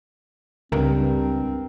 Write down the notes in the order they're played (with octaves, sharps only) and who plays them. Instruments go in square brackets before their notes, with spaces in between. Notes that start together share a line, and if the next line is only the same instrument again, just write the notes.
[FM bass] C#2 [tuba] G2 [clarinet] C4 [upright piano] A#4